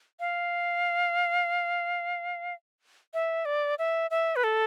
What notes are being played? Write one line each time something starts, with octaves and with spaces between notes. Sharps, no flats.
F5
E5
D5
E5
E5
B4
A4